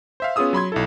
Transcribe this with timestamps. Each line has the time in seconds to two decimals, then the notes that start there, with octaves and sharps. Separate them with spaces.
0.20 C5 E5 F5
0.36 B3 C#4 F4 G#4 D#6 E6
0.53 F#3 B5 C6 G#6
0.72 B1 E4 A4